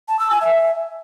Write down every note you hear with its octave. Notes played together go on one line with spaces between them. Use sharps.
A5
E6
G#5
E5